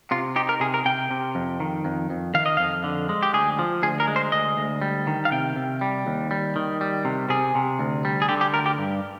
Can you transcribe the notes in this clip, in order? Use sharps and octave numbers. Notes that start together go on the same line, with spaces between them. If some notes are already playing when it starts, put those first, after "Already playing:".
C3 F4
D#4 G4
A#4
C3 G#4
A#4
C3 G5
C3
F2
D#3
F2
F2
D#3 F5
D#5
F2 F5
D3
G#3
G4
D2 G#4
F3
D2 G#4
A#4
G#3
C5
D2 D#5
D2
G3
D#3
F5
C3 G5
C3
G3
D#2
G3
D#3
G3
C3
C3 G#4
C3
D2
G3
G#4
D3 G4
G4
D2 A#4
G4
G2